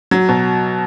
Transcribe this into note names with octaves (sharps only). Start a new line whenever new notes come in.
F#3
B2